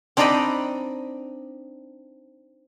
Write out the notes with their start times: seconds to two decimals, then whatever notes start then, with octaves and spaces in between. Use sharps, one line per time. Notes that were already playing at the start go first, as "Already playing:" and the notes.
0.17 C4 D4 D#4 D5 D#5 B5